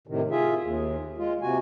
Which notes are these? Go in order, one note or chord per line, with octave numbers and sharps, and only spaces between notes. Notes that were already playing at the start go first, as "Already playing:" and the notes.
A2 C3 D#3
F4 G#4 E5
D#2
G#3 F4
C3 F#4 G#5